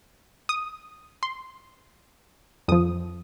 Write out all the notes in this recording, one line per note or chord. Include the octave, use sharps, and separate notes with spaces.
D#6
C6
F2 F3 D#6